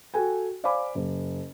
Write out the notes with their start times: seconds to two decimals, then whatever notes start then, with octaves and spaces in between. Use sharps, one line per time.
0.14 F#4 A4 G5 G#5
0.64 C5 D5 F5 G#5 B5 D6
0.95 F#1